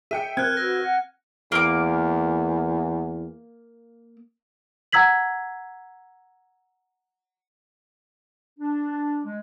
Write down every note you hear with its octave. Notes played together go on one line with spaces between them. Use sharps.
G#4 E5 G5 C#7 D#7
C4 A#4 F6 F#6 G#6
F#4 B4 E6 A#6
F#5
E2 A#3 D6
F#5 A#5 E6 G#6 B6 F#7
D4
G#3